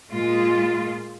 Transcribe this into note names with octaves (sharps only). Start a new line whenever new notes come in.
A#2 G#3 F4